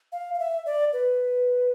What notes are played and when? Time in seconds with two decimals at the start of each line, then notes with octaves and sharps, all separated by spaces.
0.12 F5
0.34 F5
0.39 E5
0.66 D5
0.93 B4